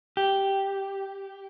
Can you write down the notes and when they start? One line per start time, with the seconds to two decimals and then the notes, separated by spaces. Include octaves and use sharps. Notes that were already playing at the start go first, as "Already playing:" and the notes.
0.17 G4